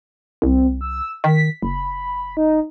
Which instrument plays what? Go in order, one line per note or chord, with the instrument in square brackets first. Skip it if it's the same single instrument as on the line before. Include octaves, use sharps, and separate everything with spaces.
[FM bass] C2 [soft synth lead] C4
[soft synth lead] E6
[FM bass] D#3 [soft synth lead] B6
[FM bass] F#1 [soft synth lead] B5
[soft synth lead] D#4